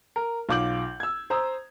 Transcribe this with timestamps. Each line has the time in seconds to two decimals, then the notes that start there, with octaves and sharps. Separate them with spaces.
0.16 A#4
0.49 B1 F4 D6 G6 F#7
1.00 E6 G#6
1.30 C5 A#5 D#6 E6